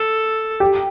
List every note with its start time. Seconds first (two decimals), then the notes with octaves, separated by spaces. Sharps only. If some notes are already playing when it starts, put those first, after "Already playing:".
Already playing: A4
0.60 G4